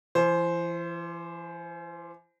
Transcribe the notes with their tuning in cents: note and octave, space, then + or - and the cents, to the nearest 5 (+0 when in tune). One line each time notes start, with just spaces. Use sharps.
E3 +40 C5 +0